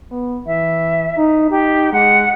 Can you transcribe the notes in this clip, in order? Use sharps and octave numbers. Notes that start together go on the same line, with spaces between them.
B3
E3 E5
D#4
D#4 G4
G#3 F#5